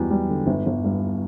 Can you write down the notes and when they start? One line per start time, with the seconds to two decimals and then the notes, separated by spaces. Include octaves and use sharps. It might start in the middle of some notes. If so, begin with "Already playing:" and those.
Already playing: E2 F#3 G3
0.10 G3
0.29 D3
0.47 G1
0.66 G1
0.84 G2